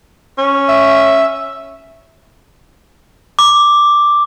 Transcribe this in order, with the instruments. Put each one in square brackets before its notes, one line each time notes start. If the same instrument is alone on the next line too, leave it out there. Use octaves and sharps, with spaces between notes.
[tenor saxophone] C#4
[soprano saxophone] E5
[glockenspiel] D6